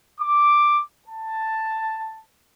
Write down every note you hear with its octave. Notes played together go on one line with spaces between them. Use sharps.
D6
A5